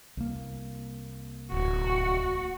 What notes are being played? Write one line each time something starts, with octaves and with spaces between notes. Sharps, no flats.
C2 A#3
D1 F#4